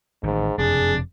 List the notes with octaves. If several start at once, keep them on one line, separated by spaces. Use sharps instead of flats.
A1 G#2 D#3
F#1 F2 C3 D4 G#4